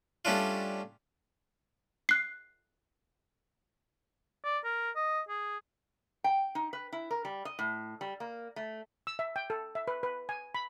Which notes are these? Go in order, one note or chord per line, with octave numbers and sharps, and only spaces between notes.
G3 A3 C#4 D4 F4
F#6 C7
D5
A#4
D#5
G#4
G5
D#4
B4
E4
A#4
G3
D#5
A2
G3
A#3
A3
E6
E5
G5
A4
E5
B4
B4
G#5
B5